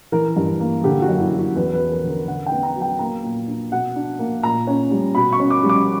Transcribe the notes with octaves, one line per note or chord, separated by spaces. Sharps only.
E3 A#4
G2
A#3
D3 G4
F#4
F#2
E4
F#3
F#4
E2 B4
B4
F#3
A#4
D3
A#4
D3 F#5
G5
B3
A#5
F#3
G5
A#3 A#5
A#2
D4
B2 F#5
D4
A#3
A#2 A#5
C#4
G3
B2 B5
C#6
C#4
D6
G3
D6